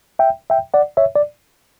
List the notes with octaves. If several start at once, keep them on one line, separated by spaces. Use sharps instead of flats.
E5 G5
E5 G5
D5 F#5
C#5 E5
D5